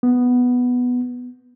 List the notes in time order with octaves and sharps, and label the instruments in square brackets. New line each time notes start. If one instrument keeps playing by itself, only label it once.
[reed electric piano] B3